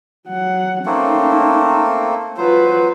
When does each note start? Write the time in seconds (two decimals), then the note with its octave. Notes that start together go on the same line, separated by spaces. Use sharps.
0.28 F#3 F#5
0.86 A3 A#3 C4 C#4 D#4
2.37 F#3 F4 B4 C5